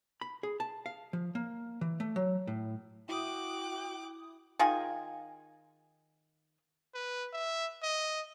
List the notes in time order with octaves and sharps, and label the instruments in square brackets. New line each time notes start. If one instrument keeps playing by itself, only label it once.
[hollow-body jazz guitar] B5
G#4
A5
F5
F3
A#3
E3
A3
F#3
A2
[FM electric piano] E4 D#6 [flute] F#4 [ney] G5 [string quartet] D6 F#6
[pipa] D#3 F4 G#4 G#5
[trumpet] B4
E5
D#5